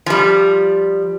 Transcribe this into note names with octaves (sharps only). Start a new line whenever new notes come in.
F3 G3